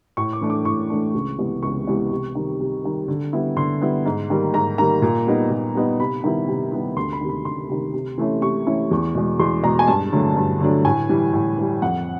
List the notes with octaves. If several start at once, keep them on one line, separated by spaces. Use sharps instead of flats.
A2 C#6
D6
E3 A3 D4
D6
A2 C#6
E3 A3 D4
C#2
C3 E3 G#3 B3
C#2 C#6
C3 E3 G#3 B3
C3
D#3 G3
C3
D#3 G3
D3
G3 B3 E4
D3 C6
G3 B3 E4
G#2
D#3 G3 A#3
G#2 A#5
D#3 G3 A#3 A#5
A#2
G3 B3 D#4
A#2
G3 B3 D#4
C3 B5
D#3 G3 B3 E4
C3
D#3 G3 B3 E4
D2 C6
B5
C3 D#3
B5
D2 C6
C3 D#3
C3
E3 A3 C#4 E4
C3 C#6
E3 A3 C#4 E4
E2
B2 G#3
E2 C6
B2 G#3 A#5
G#5
G2 A5
D3 F#3 A3 D4
G2
D3 F#3 A3 D4
A2 G#5
E3 G3
A2
E3 G3
F2 F#5